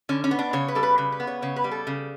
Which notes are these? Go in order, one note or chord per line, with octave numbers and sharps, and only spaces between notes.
D3 C#4
C#4
B3
D4
C#3 C#5
B4
G3 A4
B4
C#3 B4
B4
B3
C#5
C#3 C#5
B4
G3
A4
C#3